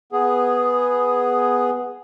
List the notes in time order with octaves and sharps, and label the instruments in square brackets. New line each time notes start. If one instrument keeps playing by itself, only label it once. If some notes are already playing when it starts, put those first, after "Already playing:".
[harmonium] B3 G#4